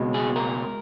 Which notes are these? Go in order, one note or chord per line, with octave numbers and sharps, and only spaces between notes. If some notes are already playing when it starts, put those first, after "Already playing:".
Already playing: C#2 B2 G#3
G#4
A#4